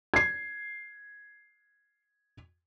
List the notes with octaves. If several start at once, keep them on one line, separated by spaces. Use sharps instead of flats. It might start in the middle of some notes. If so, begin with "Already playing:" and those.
G#6 C7